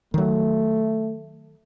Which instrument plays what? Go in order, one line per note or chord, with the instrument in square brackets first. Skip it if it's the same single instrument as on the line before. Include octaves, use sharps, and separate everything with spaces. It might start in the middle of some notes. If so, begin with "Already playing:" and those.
[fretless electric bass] D#3 F#3 [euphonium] A3